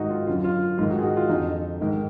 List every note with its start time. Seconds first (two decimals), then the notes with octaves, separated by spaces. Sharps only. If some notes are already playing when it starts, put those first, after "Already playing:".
Already playing: G#2 D#3 D#4 F#4
0.10 F4
0.27 F#2 D3 F4
0.44 F4
0.78 G#2 D#3 F4
0.90 D#4 F#4
0.99 G#4
1.03 D#4 F#4
1.17 F4
1.29 F2 D3 D#4
1.80 G#2 D#3